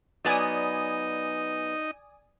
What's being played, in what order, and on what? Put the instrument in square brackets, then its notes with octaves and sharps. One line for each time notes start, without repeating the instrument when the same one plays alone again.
[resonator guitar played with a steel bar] F#3 B3 [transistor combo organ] D#4 D#5 [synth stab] D5 G#5 D#6